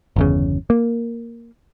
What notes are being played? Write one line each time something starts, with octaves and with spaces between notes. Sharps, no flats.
G1 E2 C#3
A#3